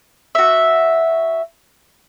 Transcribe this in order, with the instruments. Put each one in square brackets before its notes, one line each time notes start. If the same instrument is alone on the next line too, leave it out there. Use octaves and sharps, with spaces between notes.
[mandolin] F#4 E5